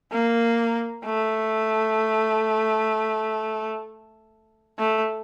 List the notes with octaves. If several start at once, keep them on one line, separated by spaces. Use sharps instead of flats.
A#3
A3
A3